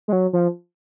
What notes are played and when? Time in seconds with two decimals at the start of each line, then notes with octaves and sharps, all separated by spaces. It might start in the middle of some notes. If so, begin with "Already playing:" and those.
0.08 G#3
0.13 F#3
0.33 F3